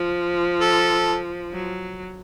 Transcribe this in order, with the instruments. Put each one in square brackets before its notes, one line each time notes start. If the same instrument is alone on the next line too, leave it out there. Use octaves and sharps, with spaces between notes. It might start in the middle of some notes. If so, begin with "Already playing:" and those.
Already playing: [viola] F3
[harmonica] A4
[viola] F#3